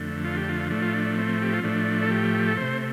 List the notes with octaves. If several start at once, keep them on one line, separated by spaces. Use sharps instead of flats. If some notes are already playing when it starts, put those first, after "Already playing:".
Already playing: F2 D3 A3
F4
G4
F4
A2 F3 A3 D4
F4
D4
C4
G4
F4
A2 F3 A3 D4
A4
G4
A4
C3 A3 C5